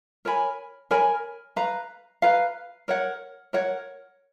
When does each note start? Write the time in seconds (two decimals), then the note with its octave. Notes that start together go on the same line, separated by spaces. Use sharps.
0.25 A#4 C#5 G#5 B5
0.91 A#4 C#5 G#5 B5
1.56 B4 F5 A#5
2.22 B4 F5 A#5
2.88 A#4 C#5 F#5
3.53 A#4 C#5 F#5